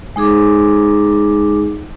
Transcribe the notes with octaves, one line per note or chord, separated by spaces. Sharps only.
G#3 D#4 G#4 D6